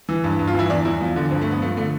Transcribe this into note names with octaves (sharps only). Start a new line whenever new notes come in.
E3
G2
G2
F4
E3 E4
E2 D4
E2 E4
F3
D3
G2 C4
A3
G2
B3
F3 A3
D3 A3